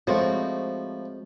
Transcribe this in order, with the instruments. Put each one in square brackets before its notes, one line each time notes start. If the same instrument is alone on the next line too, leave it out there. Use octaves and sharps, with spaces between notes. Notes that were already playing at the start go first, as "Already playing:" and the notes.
[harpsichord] A2 F3 [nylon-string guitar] G#3 C4 F#4